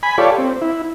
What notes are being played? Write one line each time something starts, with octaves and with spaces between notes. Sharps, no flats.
G#5 B5
F4 G4 A4 C#5 D5
C4
E4